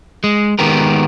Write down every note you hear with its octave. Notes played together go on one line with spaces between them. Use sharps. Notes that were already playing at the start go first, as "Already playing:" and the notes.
G#3
D#3 G#3 B3 G4 A#4